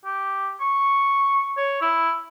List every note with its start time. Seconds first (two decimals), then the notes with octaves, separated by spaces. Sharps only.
0.05 G4
0.60 C#6
1.57 C#5
1.81 E4